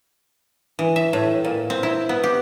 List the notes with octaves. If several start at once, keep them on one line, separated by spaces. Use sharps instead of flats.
E3
E5
A2
A#2
C4
E4
B3
G4